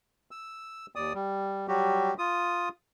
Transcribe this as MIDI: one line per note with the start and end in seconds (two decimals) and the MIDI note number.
0.31 0.86 88
0.96 1.13 39
0.96 1.13 74
0.96 1.13 87
1.14 1.67 55
1.68 2.14 54
1.68 2.14 55
1.68 2.14 66
1.68 2.14 67
2.18 2.69 65
2.18 2.69 87